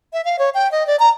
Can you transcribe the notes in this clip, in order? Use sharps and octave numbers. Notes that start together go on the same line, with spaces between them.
E5
F5
C#5
G5
D#5
D5
A#5